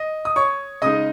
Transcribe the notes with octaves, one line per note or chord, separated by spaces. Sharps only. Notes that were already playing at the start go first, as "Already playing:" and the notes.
Already playing: D#5
D#6
C#5 C#6
C#3 G#3 D#4 D#5 D#6